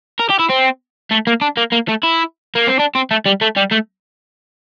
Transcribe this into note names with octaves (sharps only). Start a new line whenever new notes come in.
A#4
G4
E4
C4
A3
A#3
D4
A#3
A#3
A3
E4
A#3
C4
D4
C4
A3
G3
A3
G3
A3